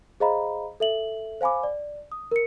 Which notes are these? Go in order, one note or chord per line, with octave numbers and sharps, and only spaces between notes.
G#4 C5 D#5 F5 A#5 B5
A4 E5 F#7
C5 F5 G#5 B5 D6
D5
D#6
A#4 C#7